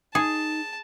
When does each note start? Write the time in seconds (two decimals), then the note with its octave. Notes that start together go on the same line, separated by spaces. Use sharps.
0.15 D#4 G#4 A5